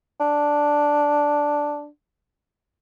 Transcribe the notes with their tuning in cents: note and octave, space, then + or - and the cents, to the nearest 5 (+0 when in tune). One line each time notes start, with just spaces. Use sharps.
D4 +0